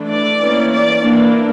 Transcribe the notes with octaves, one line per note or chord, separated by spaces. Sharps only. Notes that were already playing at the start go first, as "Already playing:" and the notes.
Already playing: E3 A3 D4
D5
E3 A#3 C#4
D5
E3 A#3 D4